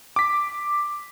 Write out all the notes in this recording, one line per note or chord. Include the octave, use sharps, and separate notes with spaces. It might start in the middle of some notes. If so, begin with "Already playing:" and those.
D6 B6